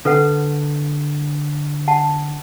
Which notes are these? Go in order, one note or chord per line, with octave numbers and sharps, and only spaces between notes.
D3 A4 B4 F#5
F#5 A5